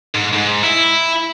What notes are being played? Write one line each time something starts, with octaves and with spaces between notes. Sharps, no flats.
G#2
G#2
E4